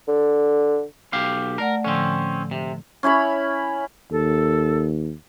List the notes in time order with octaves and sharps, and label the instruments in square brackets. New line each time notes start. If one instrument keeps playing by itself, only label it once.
[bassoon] D3
[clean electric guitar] B1 G4 F5
[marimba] A3 D5 F#5 [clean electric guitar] A#4
[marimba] A2 D3 F3 [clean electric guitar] C4 C#4
[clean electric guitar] C3
[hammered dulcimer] C#4 E4 C#5 B5
[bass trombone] D#2 [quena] A4